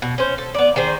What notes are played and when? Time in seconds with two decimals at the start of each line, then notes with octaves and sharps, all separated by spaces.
0.02 B2
0.18 C#4 C5
0.38 A4
0.54 B3 D5
0.76 D#3 G#4 C5